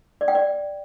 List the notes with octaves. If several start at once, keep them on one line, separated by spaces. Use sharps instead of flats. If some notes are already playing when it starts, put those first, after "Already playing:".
D5
G5
D5